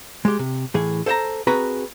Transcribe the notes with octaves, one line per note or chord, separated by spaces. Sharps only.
G#3 G4
C3
A2 E3 G#4
A4 C5 E5 A5 A#5
C4 F#4 G#4 B4 A#5 B5